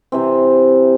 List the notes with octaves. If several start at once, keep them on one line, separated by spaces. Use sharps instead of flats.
C3 E3 C4